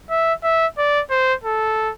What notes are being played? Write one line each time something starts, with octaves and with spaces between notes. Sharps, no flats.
E5
E5
D5
C5
A4